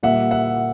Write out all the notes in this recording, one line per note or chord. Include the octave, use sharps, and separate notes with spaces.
A#2 G3 A#3 E5 F#5
E5 F#5